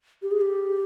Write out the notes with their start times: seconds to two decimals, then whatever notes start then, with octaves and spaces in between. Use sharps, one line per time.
0.22 G4
0.31 G#4
0.41 G4